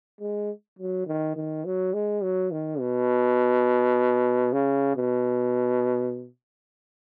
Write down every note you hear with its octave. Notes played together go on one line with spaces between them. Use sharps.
G#3
F#3
D#3
D#3
F#3
G#3
F#3
D#3
B2
C#3
B2